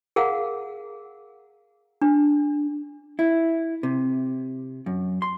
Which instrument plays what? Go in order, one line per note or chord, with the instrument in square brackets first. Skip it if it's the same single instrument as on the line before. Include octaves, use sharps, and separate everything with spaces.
[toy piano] G#4 A#4 F5 F#5
D4
[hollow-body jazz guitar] E4
C3
F#2
C6